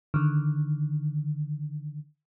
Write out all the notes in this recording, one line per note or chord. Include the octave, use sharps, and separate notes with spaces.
D3 D#3